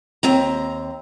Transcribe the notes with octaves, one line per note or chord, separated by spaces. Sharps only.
D#2 C4 A#5